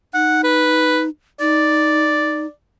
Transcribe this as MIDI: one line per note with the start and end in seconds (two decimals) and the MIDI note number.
0.14 1.09 63
0.14 0.42 78
0.44 1.02 71
1.40 2.46 63
1.40 2.50 74